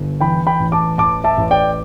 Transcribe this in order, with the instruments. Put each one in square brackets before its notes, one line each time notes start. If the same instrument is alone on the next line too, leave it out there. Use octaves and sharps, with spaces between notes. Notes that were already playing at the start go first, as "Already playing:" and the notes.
Already playing: [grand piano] G1
E3 G5 B5
G5 B5
A1
A5 D6
A1 A5 D6
E5 A5
A1
D5 G5